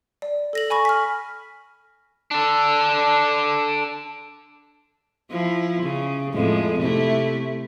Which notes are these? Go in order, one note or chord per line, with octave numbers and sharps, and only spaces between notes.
D5
A4 A#6 F#7
G#5 B5 C#6 A#6
F6 B6
D4 A4
F3 E4
C#3
F2 A2 G#3
C3 A3 E4